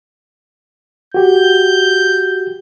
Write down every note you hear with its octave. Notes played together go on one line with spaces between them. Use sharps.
F#4 G4 G6